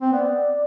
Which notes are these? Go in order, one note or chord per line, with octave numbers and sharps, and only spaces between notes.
C4
B3 D5